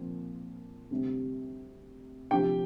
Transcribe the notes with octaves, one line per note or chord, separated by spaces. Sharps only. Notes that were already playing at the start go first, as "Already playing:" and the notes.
Already playing: A#2 F3 C4
D2 C3 G3 C4
D2 C3 F3 G4 G5